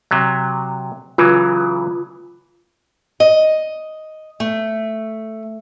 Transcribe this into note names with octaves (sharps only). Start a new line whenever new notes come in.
C3 F#3
C#3 E3 F#3 F4
D#5
A3